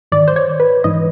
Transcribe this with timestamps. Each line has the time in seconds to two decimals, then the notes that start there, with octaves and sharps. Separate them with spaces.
0.12 G#2 D#3 D5
0.28 C5
0.36 C#5
0.60 B4
0.84 G#2 E3 D#5